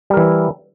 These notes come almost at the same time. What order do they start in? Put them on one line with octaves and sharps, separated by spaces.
G3 A#4 E3 E4